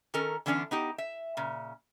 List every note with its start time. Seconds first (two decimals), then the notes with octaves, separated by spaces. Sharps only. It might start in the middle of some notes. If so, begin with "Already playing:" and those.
0.14 D#3 C#4 A4 A#4
0.46 D3 E3 B3 C#4 D4
0.71 B3 D#4 G4
0.98 E5
1.37 A#2 C#3